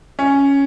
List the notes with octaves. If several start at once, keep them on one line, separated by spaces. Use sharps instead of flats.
C#4